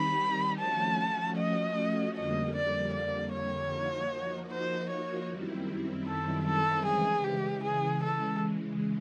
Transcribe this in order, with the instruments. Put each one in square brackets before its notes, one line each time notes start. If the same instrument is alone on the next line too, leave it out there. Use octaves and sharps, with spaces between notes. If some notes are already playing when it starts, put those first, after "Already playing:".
Already playing: [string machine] D#3 G3 C4 D#4 G4 [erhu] B5
[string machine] F3 A3 C#4 F#4 [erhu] A5
[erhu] D#5
[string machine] F2 D3 G3 A#3 [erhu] D#5
[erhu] D5
D5
C#5
[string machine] F3 A#3 D#4 F#4
[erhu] C5
C#5
[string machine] F#2 D#3 G3 C4 E4
[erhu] A4
A4
[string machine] C#3 E3 G#3 [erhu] G#4
[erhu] G4
G#4
A4